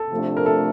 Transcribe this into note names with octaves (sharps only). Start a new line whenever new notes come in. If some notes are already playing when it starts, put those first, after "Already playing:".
Already playing: A4
C3 F3 A3 D4
A#4
A4